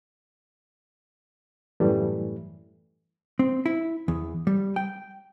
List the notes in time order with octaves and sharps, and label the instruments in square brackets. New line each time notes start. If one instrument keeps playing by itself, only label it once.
[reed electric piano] F#2 A2 E3 G3 A3
[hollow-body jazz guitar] C4
E4
E2
G3
G5